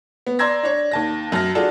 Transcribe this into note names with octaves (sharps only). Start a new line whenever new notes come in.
B3
D5 A#5 C6 E6 G#6 A#6
D4 C#5
D#2 A5 A#6
F#2 A5 F6 A#6
D4 F4 F#4 G#4 A4 A5